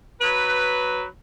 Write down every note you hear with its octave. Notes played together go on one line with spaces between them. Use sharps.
F#3 B4